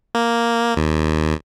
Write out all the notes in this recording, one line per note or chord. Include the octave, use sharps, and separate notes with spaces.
A#3
D#2